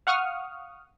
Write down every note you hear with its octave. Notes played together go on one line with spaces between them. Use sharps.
F5 F#5 C#6 D#6 F6